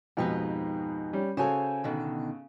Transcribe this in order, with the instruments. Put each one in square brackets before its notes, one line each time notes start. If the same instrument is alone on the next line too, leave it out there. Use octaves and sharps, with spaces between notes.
[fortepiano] F2 G#2 B2 [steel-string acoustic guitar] D#4 G4 B4
[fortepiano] G3 C#4
[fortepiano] C#3 F#4 A4 [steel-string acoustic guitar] C5 C#5 G#5
[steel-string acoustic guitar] B2 D3 D#3